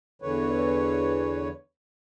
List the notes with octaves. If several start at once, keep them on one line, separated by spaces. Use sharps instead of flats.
E2 D3 E3 B4 C#5